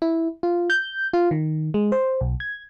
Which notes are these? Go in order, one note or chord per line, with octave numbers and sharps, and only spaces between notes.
E4
F4
G6
F4
D#3
G#3
C5
B1
G#6